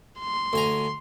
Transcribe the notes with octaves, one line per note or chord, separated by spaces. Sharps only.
C6
D2 G#5 A#5